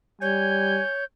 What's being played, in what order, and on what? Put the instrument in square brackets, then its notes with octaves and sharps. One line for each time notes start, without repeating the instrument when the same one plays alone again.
[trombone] G3 [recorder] C#5 [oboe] G#5 [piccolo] G6